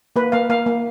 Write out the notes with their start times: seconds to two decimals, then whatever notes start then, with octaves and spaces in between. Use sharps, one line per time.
0.16 A#3 B4
0.32 A#3 F5
0.50 A#3 F5
0.66 A#3